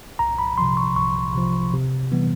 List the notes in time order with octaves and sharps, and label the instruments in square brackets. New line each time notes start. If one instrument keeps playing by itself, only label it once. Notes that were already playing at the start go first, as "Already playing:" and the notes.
[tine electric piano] C2 A#5
B5
C3 F3 C6
C#6
C2 C#6
C3 F3
C3
E3 G3 B3